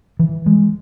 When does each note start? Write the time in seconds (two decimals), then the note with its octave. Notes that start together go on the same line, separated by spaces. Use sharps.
0.19 E3
0.46 G#3